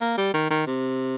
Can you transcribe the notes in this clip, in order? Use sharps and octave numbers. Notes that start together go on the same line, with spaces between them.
A#3
G3
D#3
D#3
C3